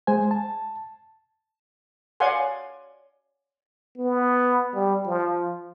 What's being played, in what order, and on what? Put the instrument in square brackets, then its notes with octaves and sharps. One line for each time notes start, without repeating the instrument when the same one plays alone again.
[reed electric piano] G#3 C5 G#5
A5
[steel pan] C#5 D5 F5 F#5 G#5 C6
[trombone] B3
G3
F3